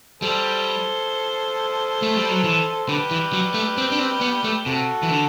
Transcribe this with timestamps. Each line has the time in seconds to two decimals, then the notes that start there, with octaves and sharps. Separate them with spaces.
0.22 G3 A4 C5
2.02 A3
2.16 G3
2.31 F#3
2.44 E3
2.88 D3 G4 B4
3.11 E3
3.33 F#3
3.54 A3
3.78 C4
3.92 D4
3.99 C4
4.21 B3
4.44 A3
4.65 C3 F#4 A4
5.03 E3
5.09 D3